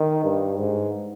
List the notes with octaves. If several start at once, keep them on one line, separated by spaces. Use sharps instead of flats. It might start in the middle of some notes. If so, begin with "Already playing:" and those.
Already playing: D#3
G2
G#2